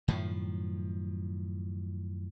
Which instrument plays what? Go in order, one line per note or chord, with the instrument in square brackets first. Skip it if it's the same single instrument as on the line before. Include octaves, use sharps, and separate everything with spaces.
[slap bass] F#2 A2 D#3 F3